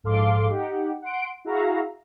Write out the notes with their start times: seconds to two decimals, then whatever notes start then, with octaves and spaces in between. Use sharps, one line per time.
0.03 A#1 G#2 A4 F5 C6 D6
0.49 D#4 G4 F#5
1.02 F#5 C6 D7
1.45 E4 F#4 G#4 E5 F5 A#5